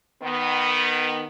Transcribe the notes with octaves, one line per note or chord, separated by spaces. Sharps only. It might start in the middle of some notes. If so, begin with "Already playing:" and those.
D#3 B3